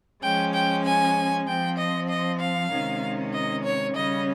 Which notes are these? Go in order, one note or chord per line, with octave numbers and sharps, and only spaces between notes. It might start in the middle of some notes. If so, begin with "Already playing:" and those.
F3 G#3 C#4 G5
G5
G#5
F3 C4 G5
D#5
D#5
F5
C3 D#3 G#3 C#4
D#5
C#5
C#3 G3 C#4 D#5